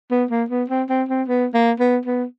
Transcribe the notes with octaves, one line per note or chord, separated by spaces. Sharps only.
B3
A#3
B3
C4
C4
C4
B3
A#3
B3
B3